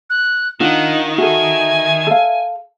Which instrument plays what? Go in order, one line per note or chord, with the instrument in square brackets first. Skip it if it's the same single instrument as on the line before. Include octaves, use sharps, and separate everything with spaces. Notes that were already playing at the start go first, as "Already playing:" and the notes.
[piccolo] F#6
[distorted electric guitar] D#3 [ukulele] D4 F4 [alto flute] D#4 [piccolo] F#5
[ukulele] F#4 A4 [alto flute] E5 [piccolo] G#5
[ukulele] A4 F5